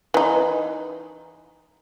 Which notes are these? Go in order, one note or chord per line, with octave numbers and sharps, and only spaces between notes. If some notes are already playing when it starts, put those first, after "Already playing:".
E3 D#4